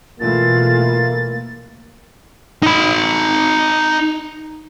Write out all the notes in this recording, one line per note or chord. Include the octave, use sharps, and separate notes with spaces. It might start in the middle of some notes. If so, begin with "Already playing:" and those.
B2 E3 A3 A#3 F4 A6
D#4 B5